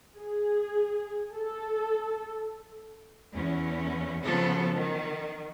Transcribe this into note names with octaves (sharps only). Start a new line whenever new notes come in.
G#4
A4
E2 C#4
C#3 F3 F#3 B3 A4
D#3